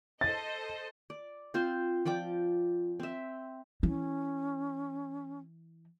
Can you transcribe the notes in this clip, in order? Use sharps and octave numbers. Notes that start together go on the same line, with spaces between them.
A4 C5 D#5 A6
D5
C4 F4 C5
F3 D5 G5 D6
C4 E5
E3 C#4